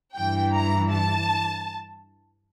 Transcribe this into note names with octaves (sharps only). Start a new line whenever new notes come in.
G2 E3 G5
A#5
A5